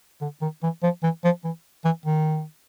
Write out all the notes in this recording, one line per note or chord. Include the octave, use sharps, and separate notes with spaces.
D3
D#3
E3
F3
E3
F3
E3
E3
D#3